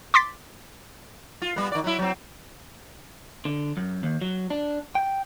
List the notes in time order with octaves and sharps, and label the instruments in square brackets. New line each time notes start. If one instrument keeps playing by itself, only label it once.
[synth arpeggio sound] C6 D6 A6 B6
[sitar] F4
G3 B3
D#3 D5
F#3 E4
F#3 C4
[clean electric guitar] D3
F#2
D#2
F#3
D4
G5